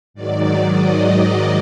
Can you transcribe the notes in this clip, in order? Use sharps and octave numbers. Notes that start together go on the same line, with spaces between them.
G#2 D#3 F#3 D5
D#5